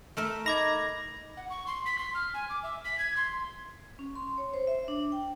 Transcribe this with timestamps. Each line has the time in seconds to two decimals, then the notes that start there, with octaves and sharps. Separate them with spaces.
0.17 A3 A#4 E5
0.46 D#4 B5 D6 G#6 A#6
1.37 F#5
1.50 C#6
1.67 C6
1.86 B6
1.99 C6
2.15 F6
2.34 G#5
2.50 D6
2.63 E5
2.85 B6
2.99 G#6
3.17 C6
3.99 C#4
4.15 C6
4.38 C#5
4.54 C5
4.67 E5
4.88 D4
5.12 G5